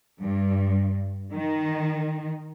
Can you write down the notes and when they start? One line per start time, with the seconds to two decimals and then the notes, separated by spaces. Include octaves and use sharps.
0.22 G2
1.33 D#3